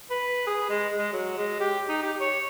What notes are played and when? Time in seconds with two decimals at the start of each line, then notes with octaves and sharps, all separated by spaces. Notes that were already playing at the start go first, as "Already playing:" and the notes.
0.10 B4
0.47 G#4
0.70 G#3
0.98 G#3
1.13 F#3
1.38 G#3
1.60 G4
1.89 D#4
2.03 G4
2.20 C#5